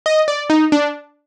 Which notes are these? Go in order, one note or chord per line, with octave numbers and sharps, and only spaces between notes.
D#5
D5
D#4
D4